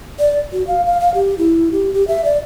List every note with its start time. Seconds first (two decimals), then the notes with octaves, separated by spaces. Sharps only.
0.19 D5
0.53 F#4
0.67 F5
0.86 F5
1.00 F5
1.14 G4
1.38 E4
1.72 G4
1.93 G4
2.08 E5
2.24 D5